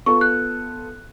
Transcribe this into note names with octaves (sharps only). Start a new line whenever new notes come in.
B3 F4 A4 C#6
F#6